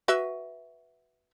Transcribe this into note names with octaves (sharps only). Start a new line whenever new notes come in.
F#4 B4 E5